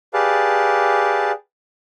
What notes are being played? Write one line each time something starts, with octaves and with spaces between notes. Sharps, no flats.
G4 G#4 B4 D5 F5 A5